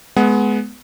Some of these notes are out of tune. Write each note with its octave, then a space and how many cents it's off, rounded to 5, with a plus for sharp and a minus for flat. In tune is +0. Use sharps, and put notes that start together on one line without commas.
G#3 +25 B3 +5 F#5 +0